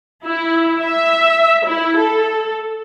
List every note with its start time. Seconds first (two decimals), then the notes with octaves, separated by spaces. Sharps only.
0.24 E4
0.81 E5
1.67 E4
1.99 A4